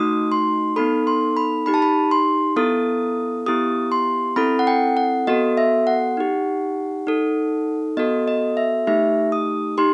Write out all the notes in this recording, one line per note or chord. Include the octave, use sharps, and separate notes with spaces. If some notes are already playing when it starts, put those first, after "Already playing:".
Already playing: A3 D#4 F#4 D#6
C6
B3 D#4 A4 B5
C6
B5
D#4 G4 B5
A5
B5
C6
B3 E4 A4 D#6
B3 E4 G4 D#6
C6
C4 E4 A4 B5
F#5
G5
F#5
B3 F#4 A4 D#5
E5
F#5
D#4 G4
D#4 A4
B3 F#4 A4 D#5
D#5
E5
A3 D#4 G4 E5
D#6
D#4 G4 C6